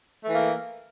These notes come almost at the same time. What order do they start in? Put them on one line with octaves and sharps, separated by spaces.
A3 E3 A#3